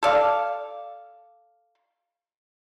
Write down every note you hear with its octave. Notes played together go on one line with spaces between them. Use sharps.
A4 D5 F5